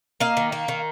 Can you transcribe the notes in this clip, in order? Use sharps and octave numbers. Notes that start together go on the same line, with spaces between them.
A#3 D#5 F5
D#3
A#3
D#3